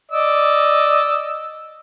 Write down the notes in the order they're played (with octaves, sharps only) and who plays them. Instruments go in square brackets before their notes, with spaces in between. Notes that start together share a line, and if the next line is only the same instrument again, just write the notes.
[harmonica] D5 D#5 E6